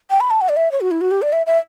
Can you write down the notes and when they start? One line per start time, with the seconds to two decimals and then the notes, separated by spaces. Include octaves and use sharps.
0.10 G5
0.20 B5
0.30 A5
0.41 F#5
0.49 D5
0.57 E5
0.72 C#5
0.81 F#4
0.91 E4
1.01 F#4
1.11 G4
1.22 D5
1.33 E5
1.47 E5